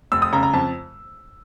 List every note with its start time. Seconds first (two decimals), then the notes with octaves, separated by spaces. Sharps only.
0.12 F1 E6
0.22 D#6
0.33 C#3 A#5
0.43 A#5
0.54 F2 A5